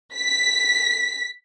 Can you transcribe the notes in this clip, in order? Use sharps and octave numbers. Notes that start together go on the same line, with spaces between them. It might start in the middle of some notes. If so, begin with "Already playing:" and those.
B6